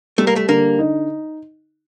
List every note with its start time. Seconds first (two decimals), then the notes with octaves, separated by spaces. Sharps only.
0.18 G3 A3
0.27 A#3
0.36 A3
0.49 D3 A#3
0.79 D#4